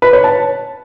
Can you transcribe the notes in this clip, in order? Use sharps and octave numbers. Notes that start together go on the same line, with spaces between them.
B4
C#5
A5